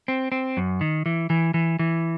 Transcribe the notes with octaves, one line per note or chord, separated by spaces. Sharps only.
C4
C4
F#2
D#3
E3
E3
E3
E3